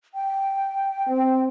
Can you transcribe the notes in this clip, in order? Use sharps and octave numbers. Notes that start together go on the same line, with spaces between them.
G5
C4